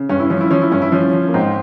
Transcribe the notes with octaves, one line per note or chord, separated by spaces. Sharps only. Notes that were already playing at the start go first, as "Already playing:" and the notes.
Already playing: C#3
G2 C#4
E4
F3 C#4
E4
F3 C#4
E4
G2 C#4
E4
F3 C#4
F3
A#3
G#2 C4